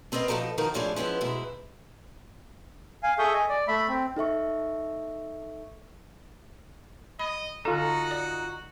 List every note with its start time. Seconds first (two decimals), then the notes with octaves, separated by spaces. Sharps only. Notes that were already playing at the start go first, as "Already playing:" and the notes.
0.12 B3 C4 A#4 D5 D#5 F5
0.28 B2 D#3 F3 D#4 A4
0.58 G#2 D#3 F3 D#4 F#4 A#4
0.74 F2 A2 F3 D4 G#4 C#5
0.96 F3 G#3 B3 C#4 E4
1.21 G#2 B2 G#3 E4
3.03 F5 G#5
3.19 G#4 A4 E5 C#6 D#6 G6
3.34 D#5 G#5
3.49 D5
3.68 A3 E5 B5
3.89 C4
4.16 D#4 A4 E5 C#6
7.19 D#5 B5
7.65 D3 D#4 F4 F#4 A4 A#5
8.11 D5